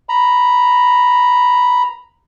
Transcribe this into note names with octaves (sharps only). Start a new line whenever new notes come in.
A#5 B5